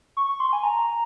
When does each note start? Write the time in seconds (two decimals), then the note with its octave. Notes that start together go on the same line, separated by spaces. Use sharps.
0.17 C#6
0.29 C#6
0.40 C6
0.53 G#5
0.64 A#5